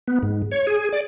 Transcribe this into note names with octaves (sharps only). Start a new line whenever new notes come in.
B3
G#2
C#5
G#4
D5